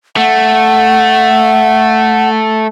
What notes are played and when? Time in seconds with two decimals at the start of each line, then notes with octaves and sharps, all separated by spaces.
0.17 A3 F#5